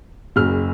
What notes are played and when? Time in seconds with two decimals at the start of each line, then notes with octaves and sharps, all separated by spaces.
0.36 F#1 F#2 C#3 F6